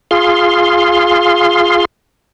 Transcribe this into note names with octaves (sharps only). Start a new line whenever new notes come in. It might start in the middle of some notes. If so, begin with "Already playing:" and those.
F4 G#4 F5 C6